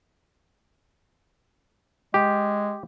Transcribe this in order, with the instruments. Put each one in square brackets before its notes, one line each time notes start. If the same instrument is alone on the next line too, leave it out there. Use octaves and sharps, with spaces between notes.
[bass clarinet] G#3 [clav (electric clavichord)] G4